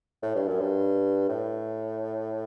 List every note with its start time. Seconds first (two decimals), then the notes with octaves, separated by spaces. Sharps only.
0.22 A2
0.35 G2
0.48 F#2
0.60 G2
1.28 A2